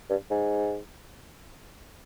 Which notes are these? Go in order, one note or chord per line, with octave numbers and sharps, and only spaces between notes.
G2
G#2